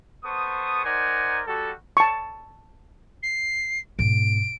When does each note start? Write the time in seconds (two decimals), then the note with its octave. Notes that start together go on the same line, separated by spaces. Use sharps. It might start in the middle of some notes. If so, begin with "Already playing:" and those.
0.24 B3 A4 C5 C#6 D#6
0.84 D#4 A#4 C5 D5 F#5 G#5
1.47 G3 F#4 A4
1.97 A5 C#6
3.23 C7
3.99 G#2 B2 D7